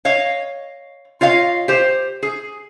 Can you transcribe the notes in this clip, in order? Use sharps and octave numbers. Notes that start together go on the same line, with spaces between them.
C#5 D#5 F5
F4 C#5 D#5 F5
G4 C5
G#4